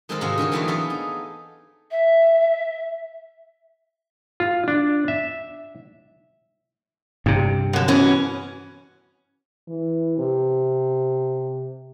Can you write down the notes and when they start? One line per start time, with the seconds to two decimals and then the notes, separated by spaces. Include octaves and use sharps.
0.09 D#3 G#3 A#3 C4 A4 A#4
0.21 G#2 C3 D#3 F#4 G#4 F5
0.38 D3 D#3 A#4 C#5
0.52 E3 F#3 A3 B3 C4 D4
0.68 B3 G#4 A4 F5
0.90 D#4
1.91 E5
4.40 F4
4.68 D4
5.08 E5
7.26 G2 C3
7.73 F#2 D3
7.88 B2 E3 C#4
9.68 E3
10.18 C3